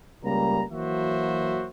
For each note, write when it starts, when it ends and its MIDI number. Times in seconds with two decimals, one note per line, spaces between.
0.24 0.63 37
0.24 0.63 55
0.24 0.63 58
0.24 0.63 82
0.71 1.67 52
0.71 1.67 54
0.71 1.67 58
0.71 1.67 66
0.71 1.67 72
0.71 1.67 76